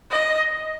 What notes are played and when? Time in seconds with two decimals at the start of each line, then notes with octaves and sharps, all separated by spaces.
0.11 D#5